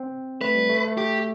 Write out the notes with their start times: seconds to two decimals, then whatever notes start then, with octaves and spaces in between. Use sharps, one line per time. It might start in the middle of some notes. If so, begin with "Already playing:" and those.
Already playing: C4
0.41 A3 B4
0.55 G3
0.69 A3
0.84 A3
0.97 A3 G4